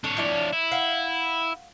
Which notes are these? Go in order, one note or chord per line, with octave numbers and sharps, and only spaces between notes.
D4 A4 C#5
F3 E4 D5
E4
F5 F#5